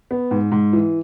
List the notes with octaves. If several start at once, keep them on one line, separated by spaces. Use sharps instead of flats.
B3
G#2
G#2
E3